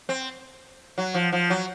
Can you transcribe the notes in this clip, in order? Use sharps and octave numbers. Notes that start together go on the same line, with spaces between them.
C4
F#3
F3
F3
F#3